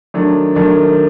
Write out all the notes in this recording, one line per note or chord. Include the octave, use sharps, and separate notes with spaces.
D#3 F#3 A3 D4
D#3 F#3 A3 D4